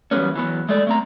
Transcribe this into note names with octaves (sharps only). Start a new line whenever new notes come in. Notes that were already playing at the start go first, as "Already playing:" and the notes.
E3 F#3 G3 A#3 B3 C#4
E3 F#3 B3
G#3 A3 D5
A3 C4 A#5